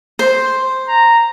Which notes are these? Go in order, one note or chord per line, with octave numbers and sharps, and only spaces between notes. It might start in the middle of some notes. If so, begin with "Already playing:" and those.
C5
A#5